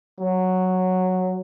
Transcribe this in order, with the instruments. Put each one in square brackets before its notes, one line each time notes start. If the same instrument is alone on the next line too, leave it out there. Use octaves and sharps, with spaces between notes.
[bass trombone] F#3